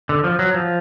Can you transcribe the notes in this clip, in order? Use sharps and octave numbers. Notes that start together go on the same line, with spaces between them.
D3
F3
F#3
F3